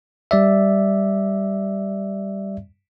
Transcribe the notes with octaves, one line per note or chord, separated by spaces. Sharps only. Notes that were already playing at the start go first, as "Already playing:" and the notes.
G3 D5 E5